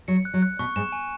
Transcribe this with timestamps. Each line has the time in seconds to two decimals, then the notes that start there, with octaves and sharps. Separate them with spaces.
0.08 F#3 C#7
0.25 F#6
0.34 F#3
0.43 F#6
0.59 B2 C#6
0.76 G#2 E7
0.92 G#5